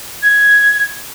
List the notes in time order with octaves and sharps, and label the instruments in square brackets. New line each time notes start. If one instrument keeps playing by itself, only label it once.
[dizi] G#6